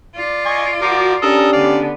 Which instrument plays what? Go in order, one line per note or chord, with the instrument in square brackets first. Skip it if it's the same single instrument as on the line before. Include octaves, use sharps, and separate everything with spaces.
[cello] F4 D5
[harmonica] D#5 G#5 C#6
[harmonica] F3 A#4 D6 [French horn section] F#4
[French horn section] C#4 D4 G4 [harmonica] A4 A#4 D#6
[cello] D3 B3 [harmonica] D5 F5